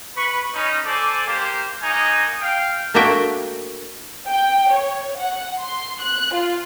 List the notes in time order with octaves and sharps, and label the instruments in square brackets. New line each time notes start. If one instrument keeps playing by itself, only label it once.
[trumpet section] B4 B5 C#6
C#4 D#4
A4 C5 D5 G#5 A5 D6
A#3 G4 C5
A#3 D#4 F#4 D#5 G#5
F5 G5
[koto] A3 A#3 D4 F#4 E5 G5
[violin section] G5
C#5
F#5
C6
F#6
F4